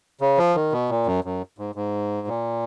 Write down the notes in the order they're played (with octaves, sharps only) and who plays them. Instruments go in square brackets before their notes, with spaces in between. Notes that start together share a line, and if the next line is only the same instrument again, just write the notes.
[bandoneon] C#3
F3
D#3
B2
A#2
F#2
F#2
G#2
G#2
A#2